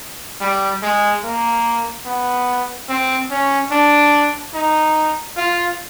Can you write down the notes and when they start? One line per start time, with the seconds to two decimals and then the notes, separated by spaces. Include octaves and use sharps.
0.41 G3
0.82 G#3
1.24 A#3
2.06 B3
2.89 C4
3.31 C#4
3.72 D4
4.54 D#4
5.37 F4